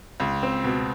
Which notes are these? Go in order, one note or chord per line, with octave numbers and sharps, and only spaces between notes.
C#2
C4
B2